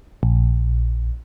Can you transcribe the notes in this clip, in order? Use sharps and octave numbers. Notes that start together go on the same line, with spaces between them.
A#1